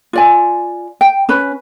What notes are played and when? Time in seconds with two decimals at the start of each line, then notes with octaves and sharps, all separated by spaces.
0.13 F4 D5 G#5
1.01 G5
1.29 C#4 B4 B5